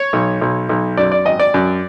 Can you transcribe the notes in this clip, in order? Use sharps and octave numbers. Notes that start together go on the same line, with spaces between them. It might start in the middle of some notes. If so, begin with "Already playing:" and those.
Already playing: C#5
B1
B1
B1
F#2 D5
D5
G#1 D#5
D5
F#2